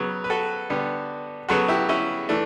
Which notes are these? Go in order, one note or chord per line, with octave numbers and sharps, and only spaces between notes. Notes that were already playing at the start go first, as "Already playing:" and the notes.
Already playing: C#3 F#3 B3
B4
F#4 A4
D3 G3 B3
C#3 F#3 B3 F#4 A4
E4 G4
C#4 E4
E3 A3 D4